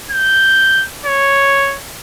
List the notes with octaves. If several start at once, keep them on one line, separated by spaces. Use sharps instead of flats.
G6
C#5